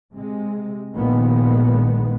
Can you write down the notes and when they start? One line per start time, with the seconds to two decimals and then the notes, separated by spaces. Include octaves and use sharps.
0.14 C3 G#3
0.95 A#1 A#2 D#3 F3 G#3 B3